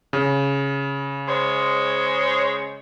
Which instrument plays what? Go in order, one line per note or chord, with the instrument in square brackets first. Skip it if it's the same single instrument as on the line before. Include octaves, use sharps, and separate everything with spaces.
[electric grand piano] C#3
[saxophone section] G#3 C5 C#5